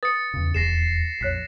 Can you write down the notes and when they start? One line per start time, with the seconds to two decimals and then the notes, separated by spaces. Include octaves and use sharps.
0.03 B4 D#6 A6 C#7
0.34 E2 C#3
0.54 D#1 E2 G#4 A#6 C7 E7
1.21 A#1 F2 C#5 F#6 B6